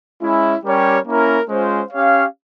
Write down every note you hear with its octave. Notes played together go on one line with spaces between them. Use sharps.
G#3 C#4 E4
G3 C#4 G4 A#4 C#5
A#3 C#4 E4 A#4
G#3 C#4 F4 C5
C#4 G4 C#5 F5